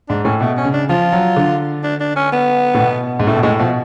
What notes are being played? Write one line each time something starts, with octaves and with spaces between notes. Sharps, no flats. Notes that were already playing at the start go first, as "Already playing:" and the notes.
G#2 D4
A2 C#4
B2 A3
C#4
C#3
D4
F3 F4
F#3
D3
D4
D4
C#4
B3
A2
B2
G#2
A2 A3
B2
A2 G#3
B2 F3